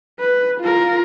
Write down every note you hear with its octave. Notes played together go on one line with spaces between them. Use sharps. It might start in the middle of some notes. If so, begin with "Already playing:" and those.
B4
F4 A#4